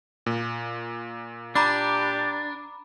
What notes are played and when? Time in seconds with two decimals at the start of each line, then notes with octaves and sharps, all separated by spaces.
0.26 A#2
1.55 D4 G4 A#5 B5 D6